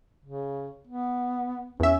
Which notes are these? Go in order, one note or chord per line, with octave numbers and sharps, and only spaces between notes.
C#3
B3
E2 C#4 E5